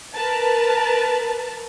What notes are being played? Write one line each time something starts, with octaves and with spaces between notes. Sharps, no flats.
A#4 B4 A5